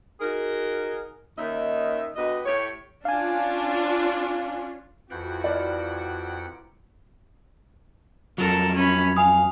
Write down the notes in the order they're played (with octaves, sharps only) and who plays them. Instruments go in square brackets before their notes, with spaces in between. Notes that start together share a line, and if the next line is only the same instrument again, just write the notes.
[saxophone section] D#4 F#4 G#4 A#4
D#2 D#3 C#4 D#5 E5
D2 B3 G4 D#5
A2 G4 C#5
[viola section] C#4 D4 F4 [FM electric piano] F5 G#5
[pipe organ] F2 F#5 G5 [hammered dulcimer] E3 [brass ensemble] F4 F#4
[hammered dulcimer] G3 A#4 [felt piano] D5
[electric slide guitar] F2 F#3 [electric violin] A4 A#4
[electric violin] C#4 B5
[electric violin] F5 [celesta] G#5 D#6